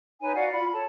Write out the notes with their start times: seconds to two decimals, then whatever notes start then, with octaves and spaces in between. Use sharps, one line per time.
0.21 D#4 B4 C#5 G#5
0.34 F#4 D5 F5 F#5
0.52 F4 B5
0.72 A4 C#5 A5